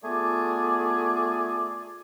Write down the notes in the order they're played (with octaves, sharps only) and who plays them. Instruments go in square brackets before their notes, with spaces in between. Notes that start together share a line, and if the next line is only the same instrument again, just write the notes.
[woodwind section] A3 B3 F4 G#4 D5 D6